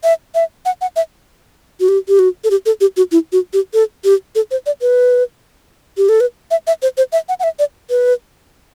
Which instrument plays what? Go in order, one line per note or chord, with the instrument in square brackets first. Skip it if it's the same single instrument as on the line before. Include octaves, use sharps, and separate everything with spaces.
[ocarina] E5
E5
F#5
F#5
E5
F#4
G4
G4
F#4
A4
G4
A4
G4
F#4
E4
F#4
G4
A4
G4
A4
C5
D5
B4
G4
A4
B4
E5
E5
C5
C5
E5
F#5
F#5
E5
D5
B4